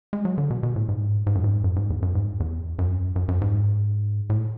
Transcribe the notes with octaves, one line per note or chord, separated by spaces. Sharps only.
G#3
F#3
D3
B2
B2
A2
G#2
G#2
F#2
G#2
F#2
G#2
E2
F#2
G#2
E2
F#2
F#2
F#2
G#2
A2